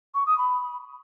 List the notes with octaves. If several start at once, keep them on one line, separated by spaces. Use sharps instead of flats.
C#6
D#6
B5